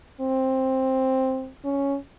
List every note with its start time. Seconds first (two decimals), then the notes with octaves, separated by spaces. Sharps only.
0.20 C4
1.65 C#4